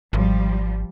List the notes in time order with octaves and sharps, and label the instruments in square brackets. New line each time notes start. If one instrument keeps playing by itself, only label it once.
[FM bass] G#1 [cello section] F3 G3